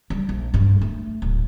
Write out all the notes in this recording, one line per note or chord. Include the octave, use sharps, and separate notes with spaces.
G3
A#1
G2
A3
D1